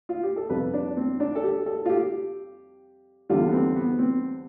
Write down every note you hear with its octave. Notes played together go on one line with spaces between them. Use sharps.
F4
G4
A4
F2 C3 G3 B4
D4
C4
D4
A4
G4
A4
F4
G4
E2 D3 G3 F4
B3
C4
B3
C4